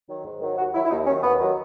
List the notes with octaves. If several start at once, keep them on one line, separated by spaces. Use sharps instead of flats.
D#3 F#3
G#2
D#3 F#3
D#2 F#4
D#3 F#3 E4
E4
D#2 D#4
D#3 F#3 C#4
D#2 B3
D#3 F#3